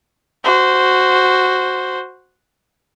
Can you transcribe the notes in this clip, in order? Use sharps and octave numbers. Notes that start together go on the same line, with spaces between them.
F#4 C5